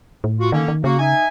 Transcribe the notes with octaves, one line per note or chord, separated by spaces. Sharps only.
A2
F4 F#4
D3 D#3 A#3 C#4
D#3
C#3 A#3 F#4
D#4 E5 G#5